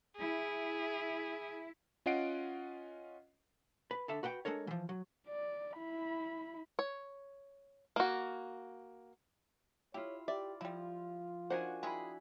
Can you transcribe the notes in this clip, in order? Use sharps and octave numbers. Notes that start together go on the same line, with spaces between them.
E4 G#4
C#4 F4 D#5 F#5 C7 D7
B4
D3 A4 E5
F#4 B4 F#5 G5
G#3 D4 A4 A#4 C#5
E3 F3
F#3
D5
E4 B5
C#5
A#3 F#4
E4 F4 G4 C#5
G4 D5 E5
F3 G3 E4 F4
D4 D#4 F#4 A#4 C5 F#5 G#5
D#3 G#3 E4 G#4 B5